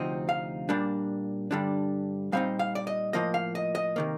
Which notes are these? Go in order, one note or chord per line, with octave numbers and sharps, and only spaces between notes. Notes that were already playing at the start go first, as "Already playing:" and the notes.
Already playing: D2 C3 F3 C4 D#4
F5
A#2 G3 A#3 D4
G2 D3 G3 D4
A#2 G3 C4 D#4 F5
F5
D5
D#5
A2 F3 A#3 D#5
F5
D#5
D#5
C3 D#3 A#3